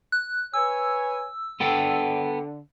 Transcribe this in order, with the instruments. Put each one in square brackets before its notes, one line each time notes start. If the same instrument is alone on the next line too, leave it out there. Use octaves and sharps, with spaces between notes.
[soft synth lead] F#6
[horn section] B4 C#5 G#5 [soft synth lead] E6
[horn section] D3 [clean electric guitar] B3 A4 G5